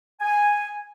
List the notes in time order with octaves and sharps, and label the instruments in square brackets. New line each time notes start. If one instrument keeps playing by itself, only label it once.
[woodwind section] G#5